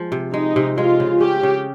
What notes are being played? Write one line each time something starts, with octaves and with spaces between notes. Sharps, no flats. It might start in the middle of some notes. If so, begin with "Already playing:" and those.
Already playing: F3 G#3
C3
G#3 D#4
C3
G#3 F4
C#3
C#4 G4
C#3